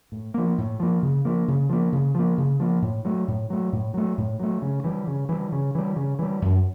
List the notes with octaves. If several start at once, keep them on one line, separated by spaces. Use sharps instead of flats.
A2
F3 A#3
A2
F3 A#3
C#3
F3 A#3
C#3
F3 A#3
C#3
F3 A#3
C#3
F3 A#3
A2
F#3 A3
A2
F#3 A3
A2
F#3 A3
A2
F#3 A3
C#3
E3 G3
C#3
E3 G3
C#3
E3 G3
C#3
E3 G3
F#2